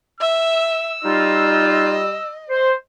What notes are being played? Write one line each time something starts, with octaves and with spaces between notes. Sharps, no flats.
E5 E6
G3 D#4 F4 D#5
C5